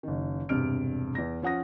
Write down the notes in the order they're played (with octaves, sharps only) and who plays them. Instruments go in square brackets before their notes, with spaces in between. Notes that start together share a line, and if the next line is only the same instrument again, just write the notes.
[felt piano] F#1 D#3
E1 G2 C3 F6 D7
E2 A#6
F3 C#4 F#5 D#6 A#6